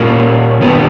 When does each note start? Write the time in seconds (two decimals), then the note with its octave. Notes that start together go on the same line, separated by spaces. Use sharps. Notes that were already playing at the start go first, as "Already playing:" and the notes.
Already playing: A#2 G3 A#3 C#4
0.61 D#3 G3 B3